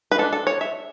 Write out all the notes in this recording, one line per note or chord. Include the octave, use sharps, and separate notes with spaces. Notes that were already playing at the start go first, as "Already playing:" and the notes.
B4
G#3 D4 A4
A4
C#5
E5